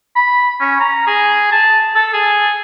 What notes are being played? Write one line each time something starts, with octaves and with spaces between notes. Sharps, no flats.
B5
C#4
A#5
G#4
A5
A4
G#4